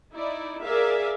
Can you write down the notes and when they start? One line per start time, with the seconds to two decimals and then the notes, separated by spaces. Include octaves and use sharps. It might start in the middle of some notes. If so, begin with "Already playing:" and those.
0.14 D#4 E4 D5
0.61 G#4 A#4 D5 E5 F5